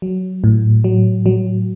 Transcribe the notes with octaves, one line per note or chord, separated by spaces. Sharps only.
F#3
A2
F#3
F#3